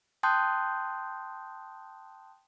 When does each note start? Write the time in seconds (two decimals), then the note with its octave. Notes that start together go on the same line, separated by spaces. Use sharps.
0.23 G5 A5 C6 D#6 F#6 G6